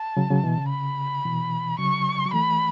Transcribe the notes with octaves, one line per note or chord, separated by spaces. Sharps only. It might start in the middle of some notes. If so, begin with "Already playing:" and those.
Already playing: A5
C#3 F#3
C#3 F#3
B2 E3
C#3
B5
B2 E3
C#3 F#3 C#6
F#3
E3 A3 B5